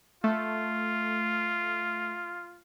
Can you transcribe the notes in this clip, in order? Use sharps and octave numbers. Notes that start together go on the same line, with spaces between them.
A3 F4